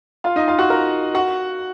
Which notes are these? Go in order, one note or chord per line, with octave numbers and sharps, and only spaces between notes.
F4 F5
D#4 D#5
F4 F5
F#4 F#5
A#4 A#5
F#4 F#5